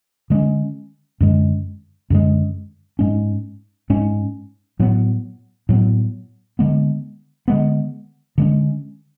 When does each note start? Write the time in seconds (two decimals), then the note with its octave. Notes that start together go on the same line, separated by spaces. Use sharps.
0.30 D3 G#3 C#4
1.20 F#2 D3 G#3
2.10 F#2 D3 G#3
2.99 G#2 G#3 C#4
3.90 G#2 G#3 C#4
4.79 A2 F#3 B3
5.69 A2 F#3 B3
6.59 D3 G#3 B3
7.48 D3 G#3 B3
8.38 D3 G#3 C#4